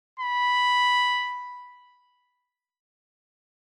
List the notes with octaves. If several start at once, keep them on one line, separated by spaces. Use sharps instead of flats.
B5